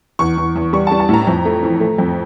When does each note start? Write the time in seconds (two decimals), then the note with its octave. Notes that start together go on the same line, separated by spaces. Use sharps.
0.19 E2 C#6
0.38 E2
0.56 E2
0.73 G3 C#6
0.87 A5
0.92 G3
1.00 A5
1.09 A2 A#5
1.27 F2
1.45 A3
1.63 E3
1.80 A3
1.98 F2